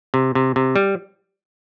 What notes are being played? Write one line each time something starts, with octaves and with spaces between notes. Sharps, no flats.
C3
C3
C3
G3